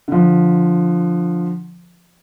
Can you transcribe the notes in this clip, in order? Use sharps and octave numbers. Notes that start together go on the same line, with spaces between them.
D3 F3